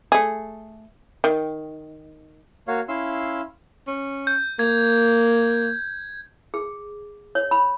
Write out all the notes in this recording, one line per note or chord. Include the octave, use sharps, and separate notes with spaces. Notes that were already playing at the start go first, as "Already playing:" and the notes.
A3 G#4
D#3
A#3 F#4 C#5 F5
C#4 E4 F5 C6 E6
C#4
G6
A#3 G#6
G#4
C#5
B5